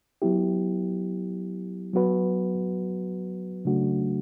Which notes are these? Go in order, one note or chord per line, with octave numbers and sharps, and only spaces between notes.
F#3 B3 E4 G4
F#3 B3 F#4 B4
C#3 F#3 A3 D4 F#4